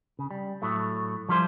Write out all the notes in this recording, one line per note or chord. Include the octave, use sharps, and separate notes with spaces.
C#3
G3
A2 F#3 A3
F3 G3 E4 F4 A4 C5